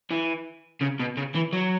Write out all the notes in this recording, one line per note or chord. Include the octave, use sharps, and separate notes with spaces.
E3
C#3
B2
C#3
E3
F#3